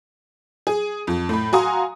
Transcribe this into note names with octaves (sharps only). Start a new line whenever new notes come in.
G#4
F2
A2 B5
F#4 F5 G#5 A#5 C6 D#6